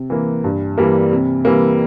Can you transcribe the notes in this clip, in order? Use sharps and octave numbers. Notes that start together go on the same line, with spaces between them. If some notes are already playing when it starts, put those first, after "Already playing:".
Already playing: C3
E3 A#3
G2
E3 G3 A#3
C3
E3 G3 A#3